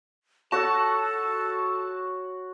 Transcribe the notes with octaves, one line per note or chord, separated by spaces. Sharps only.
F#4 A4 C#5 F#5 A5